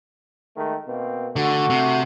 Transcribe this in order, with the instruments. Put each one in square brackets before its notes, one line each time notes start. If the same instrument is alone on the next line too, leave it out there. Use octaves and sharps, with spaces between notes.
[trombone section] D#3 G#3 A3
B2 A#3 C4
[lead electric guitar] D3 [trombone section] A3 F#4
[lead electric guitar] C3